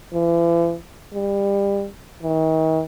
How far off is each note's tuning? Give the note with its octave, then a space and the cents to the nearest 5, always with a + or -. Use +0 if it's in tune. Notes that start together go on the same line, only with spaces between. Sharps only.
E3 +45
G3 +25
D#3 +40